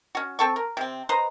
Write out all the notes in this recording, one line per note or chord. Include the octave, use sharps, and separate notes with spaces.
C#4 F#4
C4 A4 C#6
A#4
C3 C4
B4 C5 D#5 A#5